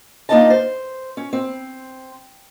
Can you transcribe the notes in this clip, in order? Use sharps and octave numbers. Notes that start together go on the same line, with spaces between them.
A#3 D4 D#4 F4 D#5 A5
C5
C#4
C4